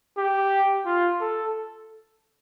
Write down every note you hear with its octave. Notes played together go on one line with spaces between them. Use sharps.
G4
F4
A4